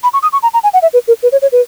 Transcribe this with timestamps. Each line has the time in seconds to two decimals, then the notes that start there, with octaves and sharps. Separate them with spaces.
0.03 B5
0.13 C#6
0.23 D#6
0.33 C#6
0.43 A#5
0.54 A#5
0.63 G#5
0.74 F#5
0.82 E5
0.93 B4
1.08 A#4
1.23 B4
1.32 C#5
1.42 C#5
1.52 B4